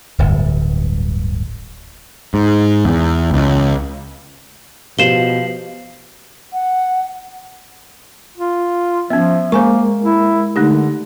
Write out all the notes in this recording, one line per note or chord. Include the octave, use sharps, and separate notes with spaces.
D1 G1 G2
G#2
E2
C#2
B2 F3 G4 C7 E7 F#7 G7
F#5
F4
F3 B3 C#4 E5
G#3 A#3 A#4 C5 G#5 C#6
E4
D3 A3 D#4 G4